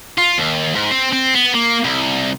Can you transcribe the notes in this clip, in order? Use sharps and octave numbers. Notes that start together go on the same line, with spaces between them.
F4
D#2
G#2
C4
C4
B3
A#3
C2